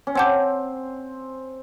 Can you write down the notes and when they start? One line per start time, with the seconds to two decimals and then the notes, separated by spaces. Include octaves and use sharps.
0.07 C#4
0.15 C4 C#5 F#5 A5 D6 G6